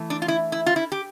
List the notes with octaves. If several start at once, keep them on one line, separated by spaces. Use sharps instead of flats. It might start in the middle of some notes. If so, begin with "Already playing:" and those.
Already playing: E3 A3
D4
F4
E4
E4
F4
E4
G4